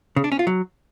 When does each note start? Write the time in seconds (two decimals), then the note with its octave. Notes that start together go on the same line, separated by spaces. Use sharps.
0.16 C#3
0.24 D4
0.32 C#4
0.39 F4
0.47 F#3